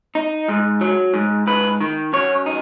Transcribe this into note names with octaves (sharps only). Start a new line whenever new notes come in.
D#4
G#2
F#3
G#2
G#2 B4
D#3
F#2 C#5
D#4